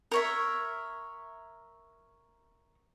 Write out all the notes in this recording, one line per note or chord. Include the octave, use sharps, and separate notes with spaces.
A#4 C#5 E5